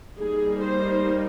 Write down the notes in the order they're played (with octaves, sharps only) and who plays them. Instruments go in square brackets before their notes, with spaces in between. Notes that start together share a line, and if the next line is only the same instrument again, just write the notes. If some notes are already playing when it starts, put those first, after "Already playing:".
[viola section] G3 A#3 D#4 G#4
C5